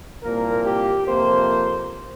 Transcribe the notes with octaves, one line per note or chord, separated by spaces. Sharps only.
C2 A#2 F3 A#3 A#4
G4
F2 C3 F3 A#3 C5